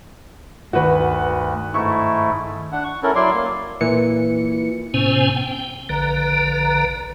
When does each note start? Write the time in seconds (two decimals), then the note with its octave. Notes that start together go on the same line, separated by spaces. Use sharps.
0.73 D2 G2 D#3 F#4 B4
1.74 G#2 A3 E4 C#6
2.72 D4 F#5
2.84 C#6
3.03 C#4 E4 A4 A#4
3.15 F#3 E4 D5 C6
3.34 A#3
3.81 A#2 E3 C#7
4.94 A2 C3 B3 C#4 C5 G#5
5.36 G5
5.89 A#1 D3 B4 A#5